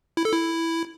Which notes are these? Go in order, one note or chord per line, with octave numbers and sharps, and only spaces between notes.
E4
A4
E4